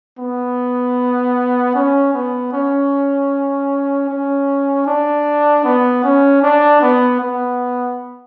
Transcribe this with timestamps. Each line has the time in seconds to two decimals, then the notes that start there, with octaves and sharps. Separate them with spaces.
0.19 B3
1.75 C#4
2.14 B3
2.53 C#4
4.09 C#4
4.87 D4
5.64 B3
6.04 C#4
6.42 D4
6.82 B3
7.20 B3